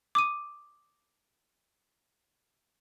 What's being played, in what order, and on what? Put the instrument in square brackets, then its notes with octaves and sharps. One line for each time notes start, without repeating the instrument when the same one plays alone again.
[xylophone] D6 D#6 D#7